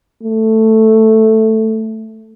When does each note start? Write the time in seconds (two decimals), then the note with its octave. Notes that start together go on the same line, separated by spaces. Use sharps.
0.23 A3